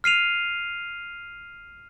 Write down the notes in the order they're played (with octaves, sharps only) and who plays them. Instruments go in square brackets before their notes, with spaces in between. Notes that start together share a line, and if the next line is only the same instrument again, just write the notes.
[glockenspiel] F6 C7 D#7 F7